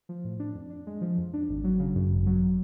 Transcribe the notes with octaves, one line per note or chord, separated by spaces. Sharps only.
F3
A2
D4
F2
D4
G#3
F3
F2
D4
G#1
F#3
C#3
F#2
G#1
F#3